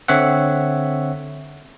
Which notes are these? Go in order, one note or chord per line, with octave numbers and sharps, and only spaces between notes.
D3 C4 C#5 E5 F#5